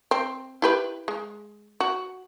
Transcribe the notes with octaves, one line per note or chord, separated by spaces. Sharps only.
C4
E4 G4 B4
G#3
F#4